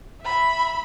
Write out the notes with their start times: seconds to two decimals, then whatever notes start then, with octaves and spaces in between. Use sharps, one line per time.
0.22 E5 B5